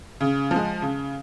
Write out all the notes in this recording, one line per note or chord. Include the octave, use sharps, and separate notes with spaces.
C#3
F3 G#3
C#3